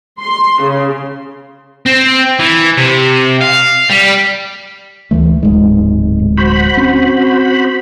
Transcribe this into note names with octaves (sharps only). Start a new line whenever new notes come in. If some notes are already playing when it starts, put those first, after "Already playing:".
C6
C#3
C4
E3
C3
F5
G3
D2 E3 A3
D1 G#2 G#3
F#4 C5 B5
C4 C#4